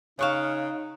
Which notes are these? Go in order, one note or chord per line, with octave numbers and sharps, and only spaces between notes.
C#3 D#4 C#5 F5 C#6 D#6 F#6 E7